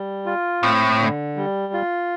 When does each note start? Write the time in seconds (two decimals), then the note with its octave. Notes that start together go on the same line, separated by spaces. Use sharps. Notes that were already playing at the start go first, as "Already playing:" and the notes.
Already playing: G3
0.26 F4
0.62 A2 C4
1.00 D3
1.36 G3
1.73 F4